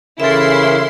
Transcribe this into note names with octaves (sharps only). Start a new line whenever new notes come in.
C#3 E3 E4 A4 A#4 E5 C6